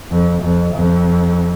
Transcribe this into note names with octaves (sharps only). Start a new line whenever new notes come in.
F2
F2
F2